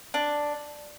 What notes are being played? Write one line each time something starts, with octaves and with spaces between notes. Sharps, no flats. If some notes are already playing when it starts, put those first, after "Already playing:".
D4